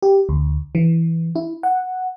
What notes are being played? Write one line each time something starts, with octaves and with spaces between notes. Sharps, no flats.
G4
D2
E3
E4
F#5